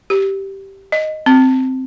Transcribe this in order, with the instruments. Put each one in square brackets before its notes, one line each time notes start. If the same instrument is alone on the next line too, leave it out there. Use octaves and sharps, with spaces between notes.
[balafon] G4
D#5
C4